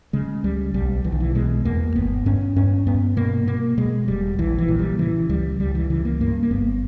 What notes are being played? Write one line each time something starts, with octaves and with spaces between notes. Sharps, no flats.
C#3 G#3
C#2 G3
B1 G3
B1 E3
D#3
E3
B2 G#3
E2 A#3
G1 B3
G2 C#4
G2 C#4
G2 B3
B2 A#3
B2 A#3
B2 G#3
E1 G3
A#1 E3
E3
A#2
G3
C#3 E3
C#2 G3
C#2 G3
E3
C#3 E3
A#3
G2 A#3
A#3
G1 B3